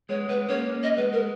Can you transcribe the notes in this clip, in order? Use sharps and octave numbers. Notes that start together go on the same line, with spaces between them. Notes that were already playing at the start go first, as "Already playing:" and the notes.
G#3 B3 C#5
G#3 B3 B4
A#3 C#4 C#5
A#3 C#4
D#5
G#3 B3 B4
A#4
G#3